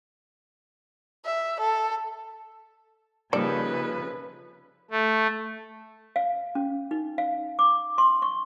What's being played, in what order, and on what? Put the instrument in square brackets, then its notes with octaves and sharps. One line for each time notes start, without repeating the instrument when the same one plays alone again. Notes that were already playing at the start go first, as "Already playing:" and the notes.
[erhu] E5
A4
[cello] C#3 B4 [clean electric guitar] F3 A4 [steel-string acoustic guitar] G3 A#3 D#4 [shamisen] D5
[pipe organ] A3
[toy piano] F5
C#4
D#4
F5
D6
C6
C#6